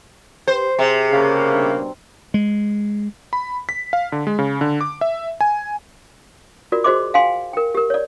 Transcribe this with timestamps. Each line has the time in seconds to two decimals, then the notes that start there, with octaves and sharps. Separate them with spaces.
0.48 G4 B4 C5
0.79 C3 G#4
1.11 C#3 A#3
1.51 B2 G3 D4
2.34 G#3
3.33 B5
3.69 B6
3.93 F5
4.12 D3
4.27 G#3
4.39 C#3
4.61 D3
4.81 D6
5.01 E5
5.41 G#5
6.72 F4 F#4 A#4 D5
6.84 F#4 G#4 C5 D#5 C6 D6
7.14 F5 G5 G#5 C6
7.53 A#4 G5
7.75 G4 A#4
7.90 C#5 D5